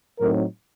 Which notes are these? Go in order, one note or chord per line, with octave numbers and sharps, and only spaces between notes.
A2 F#3 C4 D#4 A#4